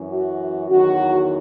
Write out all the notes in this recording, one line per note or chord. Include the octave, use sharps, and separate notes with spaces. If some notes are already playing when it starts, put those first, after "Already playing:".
Already playing: F#2 E3
F#4
E2 D#3 F#3 F#4